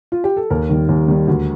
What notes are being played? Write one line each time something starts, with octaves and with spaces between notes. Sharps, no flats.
F4
G4
A4
D#2 A#4
D#3 G3
D#2
D#3 G3
D2